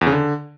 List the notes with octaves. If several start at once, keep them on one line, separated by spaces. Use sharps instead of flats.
E2
C#3
D3